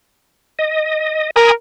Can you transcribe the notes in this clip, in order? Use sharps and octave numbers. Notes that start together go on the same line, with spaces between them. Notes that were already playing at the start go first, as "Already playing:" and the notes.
D#5
A#4 G#5 B5 D#6